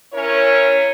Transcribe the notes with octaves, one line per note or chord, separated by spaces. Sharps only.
C#4 E4 A#4 C#5